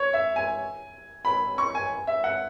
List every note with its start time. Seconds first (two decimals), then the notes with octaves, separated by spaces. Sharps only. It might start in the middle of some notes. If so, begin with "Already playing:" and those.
Already playing: C#5
0.13 E5
0.36 G#5
1.25 B5
1.58 C#6
1.75 G#5
2.07 E5
2.24 F#5